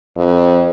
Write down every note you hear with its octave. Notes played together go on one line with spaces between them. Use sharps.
F2